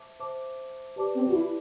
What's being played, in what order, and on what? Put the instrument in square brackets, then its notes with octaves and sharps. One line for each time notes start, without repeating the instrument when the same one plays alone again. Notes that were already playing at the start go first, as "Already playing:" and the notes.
Already playing: [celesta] C5 E5 A5 D6
C5 E5 A5 D6
G4 B4 D5 A5 D6
[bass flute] C4
F#4
E4